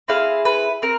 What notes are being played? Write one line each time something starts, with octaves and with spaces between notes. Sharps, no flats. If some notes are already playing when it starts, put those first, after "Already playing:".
C4 E4 G#4 F5
B4
C4 A#4